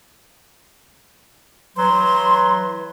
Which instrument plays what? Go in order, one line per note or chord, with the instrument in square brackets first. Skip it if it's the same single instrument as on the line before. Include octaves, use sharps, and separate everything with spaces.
[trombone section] E3 B4 [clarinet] F#3 [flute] C6